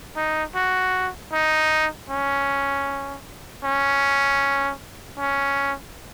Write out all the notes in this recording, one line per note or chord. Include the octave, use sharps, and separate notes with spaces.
D#4
F#4
D#4
C#4
C#4
C#4